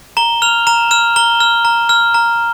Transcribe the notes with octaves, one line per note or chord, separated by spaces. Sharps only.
A#5 G7
F6 F7
A#5 E7
F6 E7
A#5 G7
F6
A#5
F6
A#5